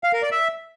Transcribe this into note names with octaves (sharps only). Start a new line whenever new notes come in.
F5
A#4
D5
E5